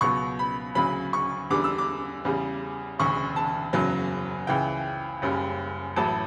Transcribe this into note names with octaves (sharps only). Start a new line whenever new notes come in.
C#2 B2 F#3 C#6
B5
D2 C#3 F#3 B5
C#6
E2 D3 G3 D6
E6
D6
E2 C#3 G3
E1 D2 C#3 C#6
A5
F#1 E2 C#3 F#3
C#2 C#3 E3 G5
F#1 F#2 C#3 G3
A1 A2 F#3 A5